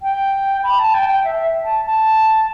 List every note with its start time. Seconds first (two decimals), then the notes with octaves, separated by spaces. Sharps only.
0.02 G5
0.64 B5
0.79 A5
0.94 G5
1.09 G5
1.24 E5
1.64 A5
1.85 A5